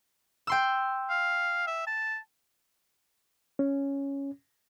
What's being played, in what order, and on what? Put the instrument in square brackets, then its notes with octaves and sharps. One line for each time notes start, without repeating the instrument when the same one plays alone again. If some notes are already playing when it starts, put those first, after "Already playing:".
[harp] G5 C6 E6
[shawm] F5
E5
A5
[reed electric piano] C#4